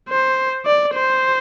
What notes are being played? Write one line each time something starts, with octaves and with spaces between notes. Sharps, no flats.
C5
D5
C5